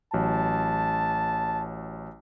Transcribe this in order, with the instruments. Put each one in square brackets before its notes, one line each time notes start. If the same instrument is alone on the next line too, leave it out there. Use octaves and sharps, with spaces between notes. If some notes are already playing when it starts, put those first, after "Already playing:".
[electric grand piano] A1 F#3 [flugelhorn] A5